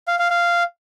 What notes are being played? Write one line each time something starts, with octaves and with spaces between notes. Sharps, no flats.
F5
F5
F5